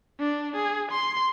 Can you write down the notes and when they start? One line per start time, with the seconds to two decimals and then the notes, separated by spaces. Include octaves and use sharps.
0.20 D4
0.56 G#4
0.92 C6